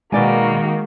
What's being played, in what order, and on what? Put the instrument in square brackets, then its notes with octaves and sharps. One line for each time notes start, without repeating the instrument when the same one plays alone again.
[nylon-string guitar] B2 D5 G#5 [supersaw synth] D#3 [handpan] G#3 [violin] A#3 F#4